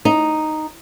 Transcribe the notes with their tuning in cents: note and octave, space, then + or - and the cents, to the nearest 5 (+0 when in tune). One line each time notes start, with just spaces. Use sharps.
D#4 -5